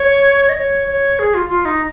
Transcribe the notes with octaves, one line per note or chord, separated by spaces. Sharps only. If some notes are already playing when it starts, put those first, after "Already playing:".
Already playing: C#5
D#5
C#5
C#5
G#4
F4
F4
D#4